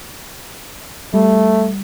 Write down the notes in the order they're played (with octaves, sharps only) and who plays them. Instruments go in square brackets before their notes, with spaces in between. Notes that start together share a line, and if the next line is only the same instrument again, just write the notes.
[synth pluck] G3 [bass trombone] A3